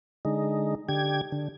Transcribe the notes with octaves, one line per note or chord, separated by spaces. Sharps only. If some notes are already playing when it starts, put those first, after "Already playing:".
D3 G#3 D#4
D3 G4 G#6
D3